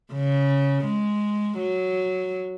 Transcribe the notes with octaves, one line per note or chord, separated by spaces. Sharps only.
C#3
G#3
F#3